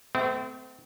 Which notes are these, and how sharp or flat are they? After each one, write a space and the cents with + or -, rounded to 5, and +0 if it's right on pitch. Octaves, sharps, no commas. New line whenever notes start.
A3 +0 C4 -35